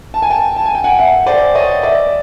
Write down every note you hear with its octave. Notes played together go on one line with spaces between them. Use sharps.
A5
G#5
G5 A5
A5
G#5
G5
F#5 G#5
E5 F#5
C5 D5
C#5 D#5
D5 E5